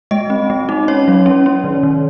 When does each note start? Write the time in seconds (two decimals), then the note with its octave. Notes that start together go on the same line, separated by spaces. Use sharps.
0.11 G#3 D#5
0.30 C4
0.50 G#3
0.69 D#4
0.88 C#4 C#5
1.08 F#3
1.26 C#4
1.46 C#4
1.64 D#3
1.83 D#3